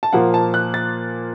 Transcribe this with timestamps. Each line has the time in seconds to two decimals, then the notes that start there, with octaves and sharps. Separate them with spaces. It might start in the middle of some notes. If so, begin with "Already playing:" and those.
0.03 A5
0.13 A#2 F3 A#3 F#5
0.34 A5
0.54 F#6
0.74 A6